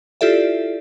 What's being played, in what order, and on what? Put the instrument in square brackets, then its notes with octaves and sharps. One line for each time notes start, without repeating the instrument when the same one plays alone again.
[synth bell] E4 F4 G4 A4 D5 E5